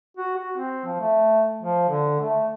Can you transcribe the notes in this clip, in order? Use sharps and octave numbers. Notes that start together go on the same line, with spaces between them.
F#4
F#4
C4
F3
A3
F3
D3
A3